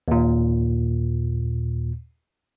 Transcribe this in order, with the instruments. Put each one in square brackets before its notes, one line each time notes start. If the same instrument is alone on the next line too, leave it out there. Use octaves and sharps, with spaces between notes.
[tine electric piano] D#2 A#2